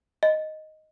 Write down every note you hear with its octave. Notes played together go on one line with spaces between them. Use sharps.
D#5